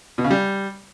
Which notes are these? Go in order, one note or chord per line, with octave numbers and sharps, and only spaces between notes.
B2
C#3
G3